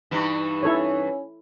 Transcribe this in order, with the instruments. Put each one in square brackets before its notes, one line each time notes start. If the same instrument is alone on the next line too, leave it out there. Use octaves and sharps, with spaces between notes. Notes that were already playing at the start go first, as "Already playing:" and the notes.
[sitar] G2 E3 [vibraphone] D#4 B5 C#6
[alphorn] C#4 [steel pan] E4 A4 C#5